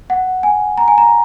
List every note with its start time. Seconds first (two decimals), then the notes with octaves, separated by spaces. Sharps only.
0.10 F#5
0.43 G#5
0.78 A#5
0.88 G#5
0.98 A#5